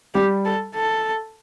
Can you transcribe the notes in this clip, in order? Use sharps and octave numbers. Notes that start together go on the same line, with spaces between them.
G3 G4
A4
A4